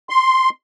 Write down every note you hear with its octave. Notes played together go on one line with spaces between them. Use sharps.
C6